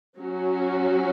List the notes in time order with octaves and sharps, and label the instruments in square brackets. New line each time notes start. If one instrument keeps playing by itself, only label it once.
[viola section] F#3 C#4 F#4